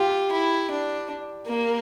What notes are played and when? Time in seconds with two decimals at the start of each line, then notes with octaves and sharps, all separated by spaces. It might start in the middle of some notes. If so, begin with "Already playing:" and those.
Already playing: F4 G4
0.32 E4
0.71 D4
1.47 A#3